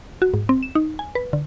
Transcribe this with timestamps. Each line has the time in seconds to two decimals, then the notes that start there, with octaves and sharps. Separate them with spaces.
0.22 F#4
0.34 G#2
0.49 C4
0.63 E7
0.75 D#4
0.99 G#5
1.15 B4
1.33 D3